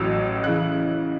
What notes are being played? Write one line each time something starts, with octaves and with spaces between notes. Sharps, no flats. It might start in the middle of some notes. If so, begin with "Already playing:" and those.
Already playing: A1 A2 F#3 E6
C#3 E3 F#6